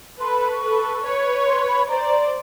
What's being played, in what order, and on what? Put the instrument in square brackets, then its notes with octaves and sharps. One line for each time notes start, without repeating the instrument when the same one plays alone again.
[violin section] A4 B4 [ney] C6
[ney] B5
B5
C#6
[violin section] A4 B4
B4 C#5
[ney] C6
B5
[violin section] C5 D5 [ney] A#5